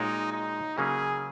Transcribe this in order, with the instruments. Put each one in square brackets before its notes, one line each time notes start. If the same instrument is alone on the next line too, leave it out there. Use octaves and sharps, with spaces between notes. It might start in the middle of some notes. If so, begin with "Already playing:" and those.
Already playing: [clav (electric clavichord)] A#2 G#3 F#4 A#4 C#5 [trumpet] D#4
[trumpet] D#4
[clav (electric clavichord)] C#3 F#3 A#3 C#4 [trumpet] G#4